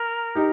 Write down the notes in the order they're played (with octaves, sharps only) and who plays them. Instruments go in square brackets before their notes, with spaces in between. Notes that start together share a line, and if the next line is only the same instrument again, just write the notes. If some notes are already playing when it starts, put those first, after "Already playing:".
Already playing: [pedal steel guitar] A#4
[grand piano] D#4 G4